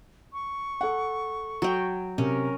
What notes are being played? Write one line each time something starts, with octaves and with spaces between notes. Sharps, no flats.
C#6
A4 F#5
F#3 G5
C3 C#4 A#4